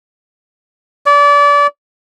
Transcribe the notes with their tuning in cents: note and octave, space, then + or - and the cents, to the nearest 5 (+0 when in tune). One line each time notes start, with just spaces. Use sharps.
D5 -30